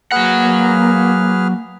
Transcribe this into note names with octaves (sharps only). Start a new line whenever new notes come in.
F#3 A#3 G#4 B4 F#5 F6